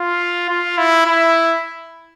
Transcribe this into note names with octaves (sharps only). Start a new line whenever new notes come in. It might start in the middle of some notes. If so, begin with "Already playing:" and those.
Already playing: F4
F4
E4
E4